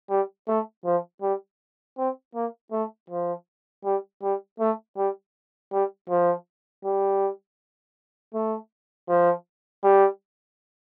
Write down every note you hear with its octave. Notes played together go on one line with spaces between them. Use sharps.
G3
A3
F3
G3
C4
A#3
A3
F3
G3
G3
A3
G3
G3
F3
G3
A3
F3
G3